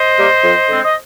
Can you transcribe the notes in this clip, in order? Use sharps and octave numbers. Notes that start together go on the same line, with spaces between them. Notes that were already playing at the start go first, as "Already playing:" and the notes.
Already playing: C5 D#5
G3 A#3
F2
D3 G#3 C4
D#5